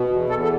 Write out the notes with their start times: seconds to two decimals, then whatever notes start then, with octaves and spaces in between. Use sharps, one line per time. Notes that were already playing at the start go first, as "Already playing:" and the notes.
Already playing: B2
0.09 E2
0.29 E2 A4
0.44 A4